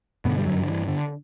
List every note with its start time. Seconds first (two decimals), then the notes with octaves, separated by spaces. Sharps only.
0.25 G2 B2 D3 B3
0.38 G3
0.46 F#2 F#3
0.62 D3
0.67 E3
0.88 D3